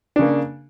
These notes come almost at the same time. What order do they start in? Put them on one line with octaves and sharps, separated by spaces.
D4 C#3 A#3